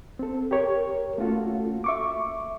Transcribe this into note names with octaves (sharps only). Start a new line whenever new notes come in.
C4 A4
G4 A#4 C#5
A3 A#3 C#4 F4 F#4 A4
E5 C#6 D6